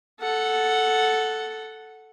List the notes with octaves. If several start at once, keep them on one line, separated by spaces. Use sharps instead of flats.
A4 F#5